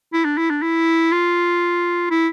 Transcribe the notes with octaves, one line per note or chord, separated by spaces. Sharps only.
E4
D4
E4
D4
E4
F4
E4